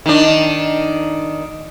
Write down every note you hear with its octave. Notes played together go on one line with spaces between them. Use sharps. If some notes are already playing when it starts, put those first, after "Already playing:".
D#3 D4